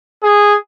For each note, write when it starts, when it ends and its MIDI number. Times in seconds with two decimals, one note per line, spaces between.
0.24 0.57 68